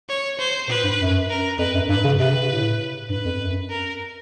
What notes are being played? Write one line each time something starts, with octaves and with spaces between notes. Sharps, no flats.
C#5
C5
A#2 B4
G2
F#2
A#4
F2 B4
F#2
G2 B4
C#3
C3 B4
A2
G2 B4
F2
F#2
A#4